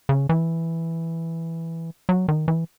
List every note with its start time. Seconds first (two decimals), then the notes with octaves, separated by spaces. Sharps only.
0.09 C#3
0.29 E3
2.09 F#3
2.28 D#3
2.48 E3